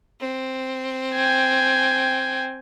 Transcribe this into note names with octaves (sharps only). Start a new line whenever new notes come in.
C4
G5 G#5